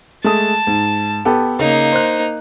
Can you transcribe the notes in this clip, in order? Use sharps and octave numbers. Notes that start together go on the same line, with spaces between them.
G#3 A3 A5 D#6
G#2
B3 G4 A4
C#3 A#3 D#4
C5 F#6